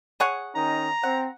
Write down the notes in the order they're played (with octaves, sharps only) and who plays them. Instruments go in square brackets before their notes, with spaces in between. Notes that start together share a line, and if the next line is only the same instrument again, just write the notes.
[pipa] G#4 C#5 F#5
[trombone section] D#3 C#4 D#4 [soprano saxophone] A#5
[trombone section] C4 [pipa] F#5